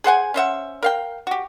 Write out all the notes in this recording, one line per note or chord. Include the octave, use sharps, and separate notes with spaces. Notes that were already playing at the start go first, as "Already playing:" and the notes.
G#4 C5 F#5 G#5
C#4 C5 E5 F#5
A#4 F5 G5
F#4 G4